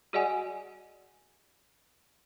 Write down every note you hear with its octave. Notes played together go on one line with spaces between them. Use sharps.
F#4 G#4 D5 D#5 F#5 G#5